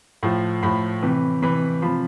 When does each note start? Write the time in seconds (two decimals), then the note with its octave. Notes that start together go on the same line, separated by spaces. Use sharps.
0.23 A2 F3
0.63 A2 F3 B5
1.03 C3 E3
1.42 C3 E3 B5
1.82 C3 F3 B5